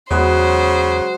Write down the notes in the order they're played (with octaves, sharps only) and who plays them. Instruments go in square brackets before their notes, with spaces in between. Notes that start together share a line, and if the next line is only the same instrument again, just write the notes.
[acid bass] E2 [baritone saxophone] C#3 [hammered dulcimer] F#3 G#3 B4 [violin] C5